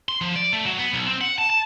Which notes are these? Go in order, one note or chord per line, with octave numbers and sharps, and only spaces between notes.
C6
F3
D5
A3
F#3
B3
B1
C4
F#5
A5
A5